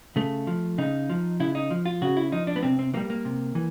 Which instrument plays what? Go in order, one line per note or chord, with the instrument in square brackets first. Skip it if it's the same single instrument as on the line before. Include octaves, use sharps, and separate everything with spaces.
[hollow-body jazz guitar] C#3 A3
F3
C#3 D#4
F3
C#3 E4
D#4
F3
F4
C#3 F#4
E4
F3 D#4
D4
B3
C3 C4
C4
E3 G3 A#3
A#3
C3
E3